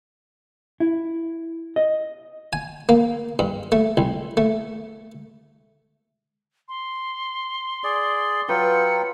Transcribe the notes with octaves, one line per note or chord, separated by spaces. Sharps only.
E4
D#5
G#5
A#3
G2
A3
C2
A3
C6
G#4 D5
F#3 F4 B4 G5 C#7